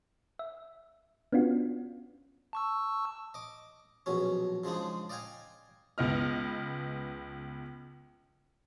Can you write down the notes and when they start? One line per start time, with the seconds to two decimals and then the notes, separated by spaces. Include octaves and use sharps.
0.39 E5
1.32 B3 C#4 D4 F4 F#4
2.53 A5 C#6 E6
3.34 D#5 D6
4.06 A#1 B2 F#3 C#4
4.64 C#3 F3 G#3 D4 D#4
5.09 D5 D#5 F5 G5 G#5
5.98 C#2 B3 D#5 F6